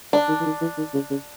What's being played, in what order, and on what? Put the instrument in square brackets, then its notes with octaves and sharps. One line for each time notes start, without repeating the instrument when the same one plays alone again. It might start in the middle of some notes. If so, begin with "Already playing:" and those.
[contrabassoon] D3 [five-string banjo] D4
[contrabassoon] D#3
E3
D#3
E3
D#3
C#3
C#3